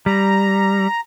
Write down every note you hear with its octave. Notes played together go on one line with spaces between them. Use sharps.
G3 A#5